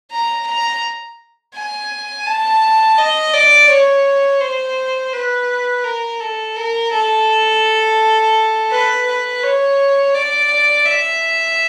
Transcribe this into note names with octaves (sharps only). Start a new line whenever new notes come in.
A#5
A#5
G#5
A5
D#5
D5
C#5
C5
B4
A#4
A4
A#4
A4
B4
B4
C#5
D5
E5